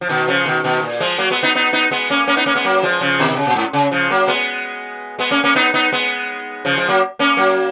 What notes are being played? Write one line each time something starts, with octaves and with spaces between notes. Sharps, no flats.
F3
B2 D#3
C#3 F3
B2 D#3
B2 D#3
A#2
F3 G#3
F#3 A#3
G#3 B3
B3 D#4
B3 D#4
B3 D#4
G#3 B3
A#3 C#4
A#3 C#4
B3 D#4
A#3 C#4
G#3 B3
F#3 A#3
F3 G#3
C#3 F3
B2 D#3
C#3
A#2
G#2
C#3
C#3 F3
F#3 A#3
G#3 B3
G#3 B3
A#3 C#4
A#3 C#4
B3 D#4
B3 D#4
G#3 B3
C#3 F3
F3 G#3
F#3 A#3
A#3 C#4
F#3 A#3